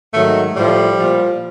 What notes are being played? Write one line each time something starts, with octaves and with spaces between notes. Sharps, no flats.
G#2 D#3 F#3 A3
A2 F3 G3
F3
A#2